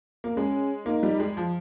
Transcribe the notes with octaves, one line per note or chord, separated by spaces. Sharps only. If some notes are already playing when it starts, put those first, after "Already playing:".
A#3
G#3 C#4
A#3 D#4
G3
G#3
F3